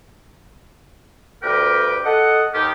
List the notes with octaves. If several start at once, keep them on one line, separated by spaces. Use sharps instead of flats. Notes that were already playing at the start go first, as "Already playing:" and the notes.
D2 G2 G4 A#4 B4 G5
A4 D#5 F#5
D#2 D#3 G4